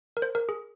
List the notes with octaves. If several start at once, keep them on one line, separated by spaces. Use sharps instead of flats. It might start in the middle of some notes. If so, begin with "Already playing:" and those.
A#4
C5
A#4
G#4